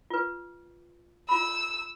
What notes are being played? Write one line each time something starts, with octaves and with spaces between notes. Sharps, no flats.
F4 B4
F4 B5 E6